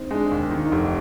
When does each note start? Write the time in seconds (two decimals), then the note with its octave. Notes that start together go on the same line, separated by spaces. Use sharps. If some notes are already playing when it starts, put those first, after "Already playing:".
Already playing: C4 D#4
0.11 G#3 D4
0.31 D#2
0.51 D#3
0.65 D#4
0.72 F1